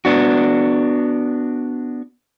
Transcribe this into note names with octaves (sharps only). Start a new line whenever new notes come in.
B3 D4 F#4